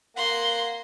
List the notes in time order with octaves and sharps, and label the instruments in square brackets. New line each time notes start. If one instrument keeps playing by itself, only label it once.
[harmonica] A#3 F#5 [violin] C6